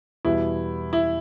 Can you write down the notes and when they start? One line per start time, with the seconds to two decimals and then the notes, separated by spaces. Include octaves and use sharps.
0.25 E2 B2 G3 E4
0.93 E4